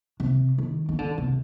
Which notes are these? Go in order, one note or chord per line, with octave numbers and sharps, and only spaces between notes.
C3
D#3
D#3
D3
C3